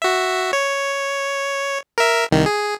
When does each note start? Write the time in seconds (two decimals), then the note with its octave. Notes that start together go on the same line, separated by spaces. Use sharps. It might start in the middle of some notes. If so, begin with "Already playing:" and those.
0.02 F#4 E5
0.53 C#5
1.98 A#4 E5
2.31 C2 D#3
2.46 G#4